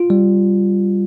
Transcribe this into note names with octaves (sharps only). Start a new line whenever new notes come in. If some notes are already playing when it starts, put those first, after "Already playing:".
Already playing: F4
G3